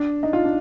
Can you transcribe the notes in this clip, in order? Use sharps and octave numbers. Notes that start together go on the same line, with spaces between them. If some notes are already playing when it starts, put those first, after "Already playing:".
Already playing: D4
D#4
F4
D4